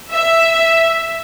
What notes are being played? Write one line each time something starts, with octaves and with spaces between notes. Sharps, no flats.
E5